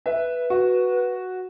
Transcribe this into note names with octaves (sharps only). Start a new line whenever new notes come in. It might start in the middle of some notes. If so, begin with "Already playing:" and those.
B4 E5
F#4